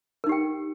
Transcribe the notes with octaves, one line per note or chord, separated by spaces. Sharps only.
D#4 G4 A#4 G5